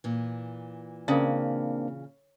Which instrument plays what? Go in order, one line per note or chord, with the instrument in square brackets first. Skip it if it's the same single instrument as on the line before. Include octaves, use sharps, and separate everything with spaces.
[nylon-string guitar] A#2 E3
[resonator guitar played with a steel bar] C#3 [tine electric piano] A#3 C4 D4